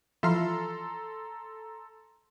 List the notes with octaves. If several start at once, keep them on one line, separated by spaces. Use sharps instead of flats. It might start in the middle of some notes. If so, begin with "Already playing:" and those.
E3 F3 F4 A4 A#5 C6